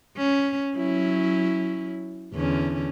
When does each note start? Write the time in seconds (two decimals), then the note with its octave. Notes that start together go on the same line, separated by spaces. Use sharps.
0.17 C#4
0.77 F#3 C#4 E4
2.34 E2 D3 C#4